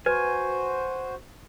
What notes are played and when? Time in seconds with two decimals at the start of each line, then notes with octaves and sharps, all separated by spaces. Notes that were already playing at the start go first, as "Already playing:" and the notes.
0.06 F#4 B4 C5 G#5